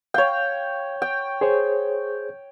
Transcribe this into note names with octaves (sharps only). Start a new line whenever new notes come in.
C#5 F5 G5
G5
G#4 C5 C#5